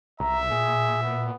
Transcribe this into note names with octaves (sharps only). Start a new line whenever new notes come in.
C2 E5 A#5
A#2 G#4
B3